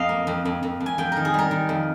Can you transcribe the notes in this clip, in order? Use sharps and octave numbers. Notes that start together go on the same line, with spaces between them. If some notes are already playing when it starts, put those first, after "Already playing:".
Already playing: F2 D#5 F5
A#3
F2
F2
F2
F2
G#5
F2 G5
D#3 A#4
G#4
G3 A#4
D#3
F2